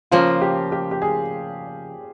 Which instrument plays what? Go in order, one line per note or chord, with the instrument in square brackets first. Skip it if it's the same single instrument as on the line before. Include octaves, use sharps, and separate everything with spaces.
[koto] C#3 F3 A#3 [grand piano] F4
[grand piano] G4
G4
G4
G#4